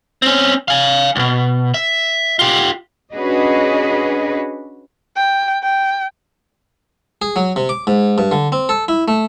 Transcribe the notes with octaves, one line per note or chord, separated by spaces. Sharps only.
C4 C#4
F5 G#5
C#2 B2
E5
F4 G4
C#4 D4 F#4 G#4 B4 D#5
G5
G5
G#4
F#3
C3
D6
G#2
G2
D3
C4
A4
E4
A3